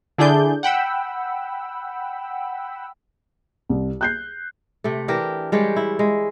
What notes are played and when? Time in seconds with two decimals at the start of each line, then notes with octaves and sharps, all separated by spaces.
0.18 D3 D4 E4 G#4 D5 G6
0.63 F#5 G5 B5 E6
3.70 C2
4.01 F#6 G6 C7
4.84 C3 A3
5.08 E3 D4 G4 A#4
5.52 G3 G#3 G4 C#5
5.76 E4
5.99 G#3